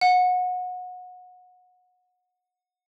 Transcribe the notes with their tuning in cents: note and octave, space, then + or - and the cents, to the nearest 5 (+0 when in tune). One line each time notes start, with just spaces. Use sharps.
F#5 -25